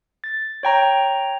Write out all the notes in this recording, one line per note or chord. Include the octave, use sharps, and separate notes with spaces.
A6
C#5 G5 A#5